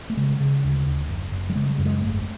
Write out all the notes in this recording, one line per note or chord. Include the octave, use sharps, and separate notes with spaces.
A3
C#3 G#3
C#3
D2
D2
F#1
F#1
G3
C#3 G#3
G3
F#2
G#3
G#1 A3